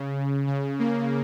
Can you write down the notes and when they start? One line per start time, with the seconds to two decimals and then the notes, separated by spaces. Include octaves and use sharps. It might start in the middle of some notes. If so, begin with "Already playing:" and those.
Already playing: C#3
0.47 C#3
0.79 A#3